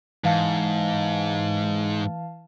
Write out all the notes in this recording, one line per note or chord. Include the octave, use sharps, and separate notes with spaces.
G#2 E3 F5 A5